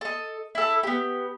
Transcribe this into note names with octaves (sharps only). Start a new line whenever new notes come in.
A4 D#5
E4 A4
B3 G4